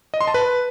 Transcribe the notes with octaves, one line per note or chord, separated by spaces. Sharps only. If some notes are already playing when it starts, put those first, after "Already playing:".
D#5
C6
A5
B4